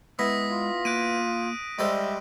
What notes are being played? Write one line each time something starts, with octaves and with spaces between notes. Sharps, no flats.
G#3 B3 E4 D#6 A#6 B6
F4
A#3 F#6 D7 D#7
G3 G#3 A4 C5 D5 E5